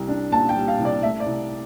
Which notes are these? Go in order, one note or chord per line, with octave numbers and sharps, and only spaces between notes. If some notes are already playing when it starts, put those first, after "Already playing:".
Already playing: C2 G3
D4
A#2 A5
G5
G3
F5
C2
D5
A3 E5
D5
C2